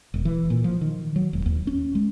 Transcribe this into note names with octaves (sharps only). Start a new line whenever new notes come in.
E1
E3
A#2
F3
D#3
F#3
E1
D#2
C#4
G#3